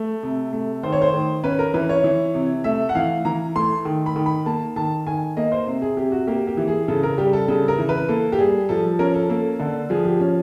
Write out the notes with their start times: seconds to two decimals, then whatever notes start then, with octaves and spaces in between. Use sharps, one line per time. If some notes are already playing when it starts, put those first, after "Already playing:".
Already playing: A3
0.23 C3
0.53 A3
0.83 D#3 C5
0.92 C#5
1.02 C5
1.14 D#3
1.44 C#4 B4
1.59 A#4
1.74 E3 B4
1.89 C#5
2.04 E3
2.35 C3
2.64 A3 E5
2.89 F#5
2.95 E3 F5
3.25 E3 A#5
3.55 A3 C6
3.85 D#3
4.06 B5
4.16 D#3
4.26 B5
4.46 A#3 A5
4.76 D#3 A5
5.07 D#3 G#5
5.37 A#3 D#5
5.52 C5
5.67 C3
5.82 G#4
5.97 C3 G4
6.12 F#4
6.27 A#3 G4
6.47 G4
6.57 E3
6.68 G#4
6.88 C#3 A4
7.03 A#4
7.18 G3 G4
7.33 A4
7.48 C#3 A4
7.68 A#4
7.78 E3
7.89 B4
8.09 A#3 A4
8.32 G4
8.39 G3 G#4
8.69 F3 A4
8.99 C#4 A#4
9.15 A4
9.29 A#3 A4
9.59 D3 A4
9.90 F3 G#4
10.05 G4
10.20 C#4